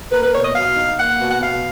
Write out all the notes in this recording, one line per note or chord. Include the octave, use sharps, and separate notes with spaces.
A#3 B4
B4
B2 C#5
D#5
B2 F5
D#4
A#3 F#5
B2
F#5
B2 F5